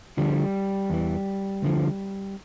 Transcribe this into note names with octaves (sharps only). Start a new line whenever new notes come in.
D2 D3 F3 G3
E2 E3
D2 D3 F3